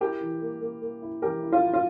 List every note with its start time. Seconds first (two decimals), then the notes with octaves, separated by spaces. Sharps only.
0.01 E4 G4 A#4
0.21 E3
0.42 A#3
0.61 A#3
0.82 A#3
1.02 E4
1.22 E3 G4 A#4
1.42 E4
1.52 F4
1.62 E4
1.73 F4